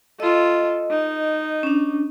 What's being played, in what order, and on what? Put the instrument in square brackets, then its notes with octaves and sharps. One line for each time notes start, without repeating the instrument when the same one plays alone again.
[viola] F4 A4 [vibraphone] D#5
[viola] D#4
[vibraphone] C#4 D4